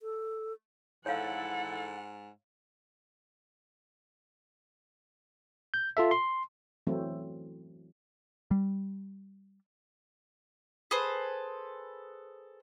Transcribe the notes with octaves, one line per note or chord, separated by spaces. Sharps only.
A4
G#2 E4 A4 C#5 F5 F#5
G6
F4 A4 E5
C6
E3 F#3 A3 C4 E4
G3
G#4 A4 B4 C5